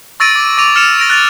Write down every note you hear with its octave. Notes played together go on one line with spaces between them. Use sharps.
C#6 E6 A6 A#6 D7 D#7
D6
D6 A#6 D#7 F7
F6 C#7 E7 F7
A6 A#6 D7 F7
F#6 A6 F7